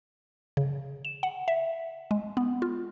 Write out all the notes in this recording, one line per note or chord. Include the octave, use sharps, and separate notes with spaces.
C#3
E7
F#5
E5
G#3
B3
F4